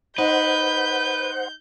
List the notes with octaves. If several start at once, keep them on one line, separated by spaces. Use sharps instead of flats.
D#4 B4 C5 F#5 G6